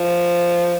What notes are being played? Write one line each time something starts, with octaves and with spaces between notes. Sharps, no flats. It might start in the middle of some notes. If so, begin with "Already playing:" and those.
Already playing: F3